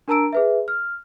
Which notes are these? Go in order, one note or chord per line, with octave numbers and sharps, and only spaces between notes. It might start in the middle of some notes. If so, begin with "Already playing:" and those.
D4 A#4 A5 A#5 E6 D7
G#4 B4 E5
F6